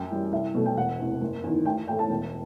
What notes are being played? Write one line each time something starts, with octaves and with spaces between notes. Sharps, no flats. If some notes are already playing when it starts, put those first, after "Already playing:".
Already playing: F#2 G5
E3 G3
C2 E5
B2 F#3 A3
G5
E1 F#5
E2 C3
F#1
E2 D#3
A1 G5
A2 E3 A3 G5
A5
E1